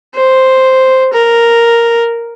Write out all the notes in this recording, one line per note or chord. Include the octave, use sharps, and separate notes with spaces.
C5
A#4